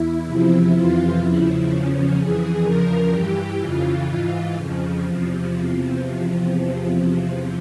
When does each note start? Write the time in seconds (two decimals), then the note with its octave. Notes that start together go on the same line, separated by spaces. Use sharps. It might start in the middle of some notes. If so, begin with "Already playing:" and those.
Already playing: E2 E4
0.23 E2 C3 F3
0.71 F2 C3 E3 F4
1.20 E2 C#3 F3 E4
1.67 E2 C#3 F3 C#4
2.15 F2 E3 G#4
2.63 E2 C#3 F3 A#4
3.10 G2 E3 G4
3.59 F2 C#3 E3 F4
4.06 G#2 E3
4.55 F2 C#3 F3
5.02 E2 C3 F3
5.50 E2 C3 F3